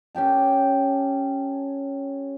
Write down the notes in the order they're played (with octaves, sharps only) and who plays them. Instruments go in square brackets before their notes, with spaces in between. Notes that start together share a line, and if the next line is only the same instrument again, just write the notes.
[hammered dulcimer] C#4 G4 G5 A5